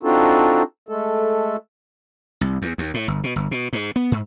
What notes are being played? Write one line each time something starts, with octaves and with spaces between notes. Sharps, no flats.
C4 D4 D#4 F4 F#4 A4
G#3 A3 A4
C2
E2
D#2
A2
G1
B2
G1
B2
G#2
B3
G#2